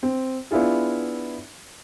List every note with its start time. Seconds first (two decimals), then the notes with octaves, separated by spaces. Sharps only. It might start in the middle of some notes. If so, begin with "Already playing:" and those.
0.03 C4
0.51 B3 D4 E4 F4 G#4